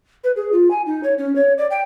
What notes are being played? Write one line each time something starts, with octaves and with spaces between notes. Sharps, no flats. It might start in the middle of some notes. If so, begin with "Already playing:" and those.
B4
G#4
F4
G#5
D#4
C#5
C#4
C#5
D5
G5